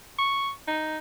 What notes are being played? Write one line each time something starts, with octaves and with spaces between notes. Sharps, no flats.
C#6
D#4